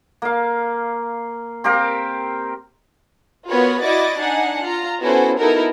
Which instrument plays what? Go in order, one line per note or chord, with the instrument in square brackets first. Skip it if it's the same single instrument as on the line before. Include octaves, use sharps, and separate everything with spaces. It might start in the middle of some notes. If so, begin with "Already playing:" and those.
[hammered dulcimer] A#3 F5
C4 G4 A#4 F5
[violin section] B3 F4 F#4 A#4 C#5 B5
E4 F#4 D5 D#5 D6 A6
D4 D#4 F#5 G#5
F4 A#5
B3 C#4 E4 F#4 A4 C5
B3 D#4 E4 F#4 A4 A#4